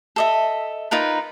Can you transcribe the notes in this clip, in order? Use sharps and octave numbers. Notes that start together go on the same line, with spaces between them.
A4 D#5 E5
D#4 F4 A#4 B4